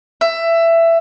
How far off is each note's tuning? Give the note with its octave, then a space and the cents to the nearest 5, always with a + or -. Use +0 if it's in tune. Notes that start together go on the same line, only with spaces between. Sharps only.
E5 +15